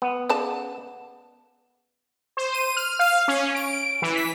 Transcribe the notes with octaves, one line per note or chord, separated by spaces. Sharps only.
B3
C#3 D5 A5
C5
D#7
F6
F5
C#4
D7
E3
B6